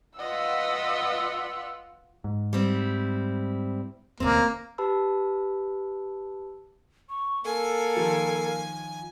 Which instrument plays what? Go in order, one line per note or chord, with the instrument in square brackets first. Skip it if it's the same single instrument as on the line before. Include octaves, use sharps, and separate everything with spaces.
[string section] F4 F#5 [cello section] B4 [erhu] D#5 [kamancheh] E6
[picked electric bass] G#2
[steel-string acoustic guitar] G3 C4 E4
[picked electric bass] E1 D2 [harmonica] A#3 [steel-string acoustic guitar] C4 C#4
[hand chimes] G4 B4 A5 B5 E6
[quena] C#6
[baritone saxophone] A#3 [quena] A4 [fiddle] G#5
[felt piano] D#3 F3